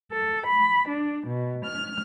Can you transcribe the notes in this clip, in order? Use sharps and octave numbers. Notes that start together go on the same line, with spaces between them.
A4
B5
D4
B2
F6